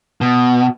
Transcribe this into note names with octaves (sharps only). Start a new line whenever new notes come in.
B2